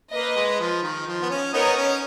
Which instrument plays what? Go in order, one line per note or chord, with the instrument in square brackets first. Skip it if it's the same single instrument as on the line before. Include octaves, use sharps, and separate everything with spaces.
[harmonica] A#3 [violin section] B4 D#5
[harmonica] G#3
F3
D#3
F3
B3
C#4
[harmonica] B3 D#4 [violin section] A#4 C#5
[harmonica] C#4